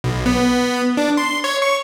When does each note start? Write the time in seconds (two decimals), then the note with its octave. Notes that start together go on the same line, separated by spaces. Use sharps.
0.04 B1
0.26 B3
0.97 D4
1.17 C6
1.44 C#5
1.62 C#6